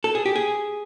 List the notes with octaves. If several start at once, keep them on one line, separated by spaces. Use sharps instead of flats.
A4
G#4
G4
G#4